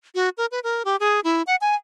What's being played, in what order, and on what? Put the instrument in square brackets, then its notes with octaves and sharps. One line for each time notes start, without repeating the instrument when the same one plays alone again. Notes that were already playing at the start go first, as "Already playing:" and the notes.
[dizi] F#4
A#4
B4
A#4
G4
G#4
E4
F#5
G#5